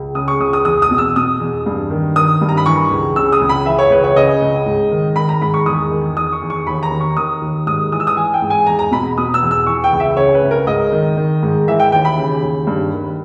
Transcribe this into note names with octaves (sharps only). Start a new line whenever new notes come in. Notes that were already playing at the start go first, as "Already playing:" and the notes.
Already playing: C#2
C#3 D#6
C#6
C#2 D#6
D#6
E2 D#6
D#6
B2
E6
B2 D#6
E2
G2
D#3
D#3 D#6
G2
A#5
B5
E3 C#6
C#2
C#3 E6
D#6
C#2
B5
E3 E5
C#5
C#2 B4
C#5
C#3 D#5
C#2
G#2
D#3
D#3 B5
A#5
G#2 B5
C#6
E2 D#6
D#3
D#3 D#6
C#6
E2
C#6
D#2 B5
A#5
D#3
C#6
D#3 D#6
D#2
G#2 D#6
E3 D#6
E6
D#6
E3 G#5
G5
G#2
G#5
E2 A#5
A#5
B2 B5
B2 D#6
E6
E2
E6
E3 C#6
G5
C#2
E5
C#3 C#5
B4
C#2
A#4
G#2 D#5
D#3
D#3
G#2
E3 E5
G5
D#2 G5
B5
C#3
D#2
G2
D#3